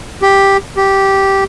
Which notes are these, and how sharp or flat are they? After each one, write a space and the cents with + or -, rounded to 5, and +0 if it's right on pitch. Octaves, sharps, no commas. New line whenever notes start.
G4 +0
G4 -10